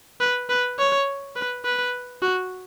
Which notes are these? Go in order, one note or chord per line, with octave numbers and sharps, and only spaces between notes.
B4
B4
C#5
B4
B4
F#4